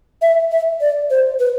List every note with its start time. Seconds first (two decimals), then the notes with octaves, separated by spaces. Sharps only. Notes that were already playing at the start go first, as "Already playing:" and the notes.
0.22 E5
0.52 E5
0.81 D5
1.10 C5
1.40 B4